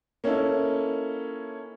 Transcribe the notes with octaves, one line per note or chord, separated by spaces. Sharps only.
A#3 C#4 D#4 E4 A4